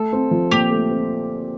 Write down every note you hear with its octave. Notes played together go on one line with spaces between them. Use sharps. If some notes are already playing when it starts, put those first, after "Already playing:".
Already playing: A3 A4
C4
F3
A#2 G4
A3
C4